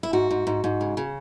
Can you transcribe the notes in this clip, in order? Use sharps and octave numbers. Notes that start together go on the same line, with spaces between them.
E4
G#2 F#4
G#2
G#2
G#2
C#3
C#3